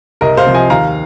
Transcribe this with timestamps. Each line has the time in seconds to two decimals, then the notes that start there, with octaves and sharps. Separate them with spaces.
0.21 C2 A#4 D#5
0.37 C5 F5
0.46 C3 F3
0.54 D#5 G#5
0.70 D#2 F5 A#5